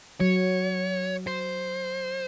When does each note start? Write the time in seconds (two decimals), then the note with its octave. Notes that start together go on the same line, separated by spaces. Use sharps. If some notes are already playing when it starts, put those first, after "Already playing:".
0.20 F#3 C#5
1.27 C5